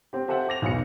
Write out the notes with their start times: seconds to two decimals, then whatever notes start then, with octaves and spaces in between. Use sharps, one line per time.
0.13 C4 G4
0.28 G4 A4 C5 E5 F#5 G5
0.49 D6 A#6 F7
0.62 B1 E2 B2 B3 F#4 C#7